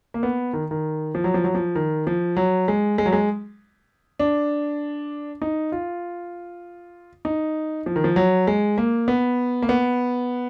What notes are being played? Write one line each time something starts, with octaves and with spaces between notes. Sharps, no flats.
A#3
B3
D#3
D#3
F3
F#3
F3
F#3
F3
D#3
F3
F#3
G#3
G#3
F#3
G#3
D4
D#4
F4
D#4
F3
D#3
F3
F#3
G#3
A#3
B3
A#3
B3